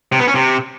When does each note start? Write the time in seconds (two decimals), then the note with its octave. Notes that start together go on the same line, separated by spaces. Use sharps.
0.12 C3
0.20 B3
0.27 C#4
0.35 C3